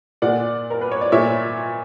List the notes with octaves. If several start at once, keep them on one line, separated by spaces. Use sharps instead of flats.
A#2 D5 F#5
A#4
B4
C#5
D5
A#2 C#5 E5